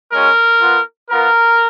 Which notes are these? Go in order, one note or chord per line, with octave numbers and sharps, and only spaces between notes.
G#3 C#4 F#4 A#4
B3 F4
B3 F4 A#4